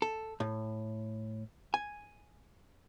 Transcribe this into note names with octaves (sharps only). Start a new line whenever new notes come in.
A4
A2
G#5